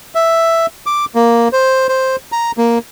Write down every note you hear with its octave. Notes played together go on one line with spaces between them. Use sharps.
E5
D6
A#3
C5
C5
A#5
A#3